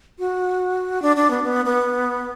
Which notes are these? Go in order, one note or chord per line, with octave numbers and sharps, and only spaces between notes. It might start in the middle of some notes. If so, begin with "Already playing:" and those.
F#4
D4
D4
B3
B3
B3